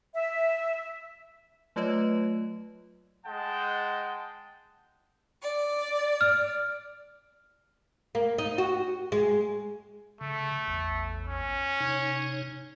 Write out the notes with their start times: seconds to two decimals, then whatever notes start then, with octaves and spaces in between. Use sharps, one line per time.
0.14 E5
1.76 F#3 A3 F4 B4 C#5 D#5
3.25 G#3 F#5 G5 A5
5.41 D5
6.21 F6
8.15 A#3
8.38 D#4
8.58 F#4
9.12 G#3
10.21 C#3 A3
10.68 A1 E2
11.27 C#4
11.80 C3 D#4 C#5